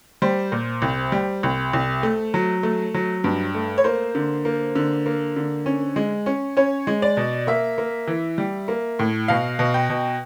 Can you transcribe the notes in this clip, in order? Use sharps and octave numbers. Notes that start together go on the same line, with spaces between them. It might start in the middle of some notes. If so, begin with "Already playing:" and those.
G3 C5
A#2
C2
G3
C2
C2
A3
F#3
A3
F#3
G2
A3
C#5
A#3 C5
D3
A#3
D3
A#3
D3
C#4
G#3
C#4
C#4 C#5
G#3
D5
B2
A#3 E5
A#3
E3
G3
A#3
A2
B2 F5
B2
G5
B2